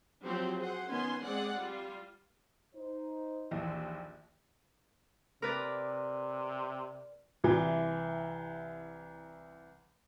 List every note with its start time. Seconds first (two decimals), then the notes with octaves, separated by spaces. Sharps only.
0.24 F3 F#3 C4 F#4 G4 C5
0.58 G#4 C5 F#5
0.89 D#3 B3 C#4 G#5 C6
1.24 G#3 C4 G#4 D5 F#5
1.57 G3 F4
2.75 D#4 C5
3.51 A#1 D#2 E3
5.42 C3 A#4 B4 D5
7.44 C2 E3